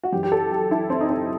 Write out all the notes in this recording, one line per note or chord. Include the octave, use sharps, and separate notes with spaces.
F#4
F#2 E3 G4
G4
A4
G4
E4
C4
D#4
C4